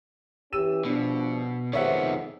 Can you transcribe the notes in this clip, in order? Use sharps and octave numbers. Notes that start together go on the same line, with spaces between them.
E3 C#4 G4 E6 D#7 E7
G2 B2 F3 D4
F2 G#2 C3 D#3 B3 C#5 E5 F#5